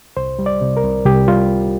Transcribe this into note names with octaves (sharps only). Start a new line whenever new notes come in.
C2 C5
G3
D5
C3
A#4
C2
C2 G4
G3 F4